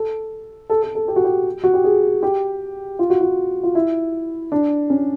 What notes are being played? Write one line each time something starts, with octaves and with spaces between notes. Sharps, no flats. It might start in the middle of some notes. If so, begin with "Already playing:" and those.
Already playing: A4
A4
A4
A4
G4
F#4
G4
F#4
G4
G#4
G4
F4
F#4
F4
F4
E4
D4
C#4